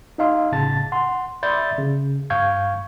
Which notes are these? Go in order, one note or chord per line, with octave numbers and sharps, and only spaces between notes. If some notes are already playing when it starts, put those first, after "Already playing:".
D#4 D#5 F5 C6
G1 A2 C#3 A5 A6
F#5 C6
D5 E5 B5 C6 G6 A6
C#3
G2 F5 C#6 G6 G#6